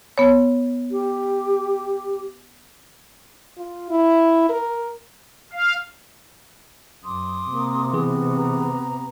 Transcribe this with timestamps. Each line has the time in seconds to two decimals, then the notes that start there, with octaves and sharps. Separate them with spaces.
0.18 B3 C#5
0.92 G4
3.58 F4
3.90 E4
4.50 A#4
5.53 F5
7.04 F#2 C6 D6 D#6
7.50 C3 A#3
7.93 E3 B3 G#4
8.36 A#5